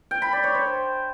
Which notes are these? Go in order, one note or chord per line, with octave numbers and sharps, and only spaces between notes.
G5
B5
D5
C#5
C5